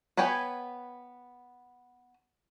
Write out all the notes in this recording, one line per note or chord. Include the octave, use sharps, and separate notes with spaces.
B3 B4 C#5 G5 G#5